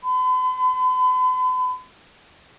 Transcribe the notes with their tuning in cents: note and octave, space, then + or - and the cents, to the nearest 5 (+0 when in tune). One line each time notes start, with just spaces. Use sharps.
B5 +45